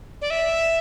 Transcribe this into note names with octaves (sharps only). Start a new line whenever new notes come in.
D5
E5